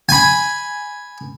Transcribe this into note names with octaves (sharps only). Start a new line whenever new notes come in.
G#5 B5